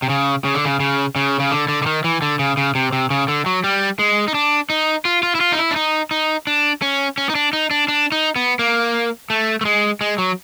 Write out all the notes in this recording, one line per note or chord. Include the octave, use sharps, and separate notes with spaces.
C3
C#3
C#3
D3
C#3
C#3
C#3
C#3
D3
D3
D3
D#3
E3
D3
C#3
C#3
C3
C3
C#3
D3
F#3
G3
G#3
D#4
D4
D#4
F4
F4
E4
F4
D#4
E4
D4
D#4
D#4
D4
C#4
C#4
D#4
D4
D#4
D4
D4
D#4
B3
A#3
A3
A3
G#3
G#3
F#3